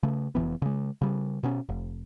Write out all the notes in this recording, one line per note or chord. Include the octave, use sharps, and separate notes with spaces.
C#3 A3
F1 F2 E3 B3
C#3 G#3
C#3 G3
B2 B3 C#4
F1